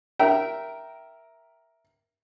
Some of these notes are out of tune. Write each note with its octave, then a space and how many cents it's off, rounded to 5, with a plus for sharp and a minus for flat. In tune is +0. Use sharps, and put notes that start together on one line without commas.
A#4 +5 E5 +0 G5 -20